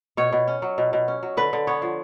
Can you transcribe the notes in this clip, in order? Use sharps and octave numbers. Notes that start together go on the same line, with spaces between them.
B2 C#5
B2
C#4
F#3
B2
B2
C#4
F#3
D3 B4
D3
B3 C#5
F3